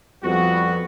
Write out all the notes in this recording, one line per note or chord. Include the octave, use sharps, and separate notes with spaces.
F2 G3 B3 F#4